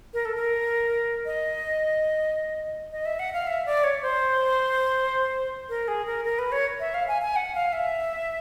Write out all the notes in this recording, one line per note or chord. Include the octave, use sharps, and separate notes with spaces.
A#4
A4
A#4
D#5
D#5
E5
F#5
F5
E5
D5
C#5
C5
A#4
G#4
A#4
A#4
B4
C#5
E5
F5
G#5
G#5
F#5
F5
E5